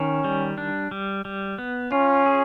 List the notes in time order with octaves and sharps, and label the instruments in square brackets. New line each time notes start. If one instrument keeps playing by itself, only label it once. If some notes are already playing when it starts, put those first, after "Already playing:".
Already playing: [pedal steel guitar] D#3 [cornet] C#4
[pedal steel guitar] G3
D4
G3
G3
B3
[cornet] C#4 [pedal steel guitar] F4
[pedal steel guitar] G#4